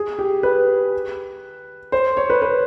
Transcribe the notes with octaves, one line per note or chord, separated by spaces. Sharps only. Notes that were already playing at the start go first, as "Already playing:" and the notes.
Already playing: G#4
G4
B4
C5
C#5
B4
B4